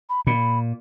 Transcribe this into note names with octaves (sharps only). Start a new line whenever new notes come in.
B5
A#2 B5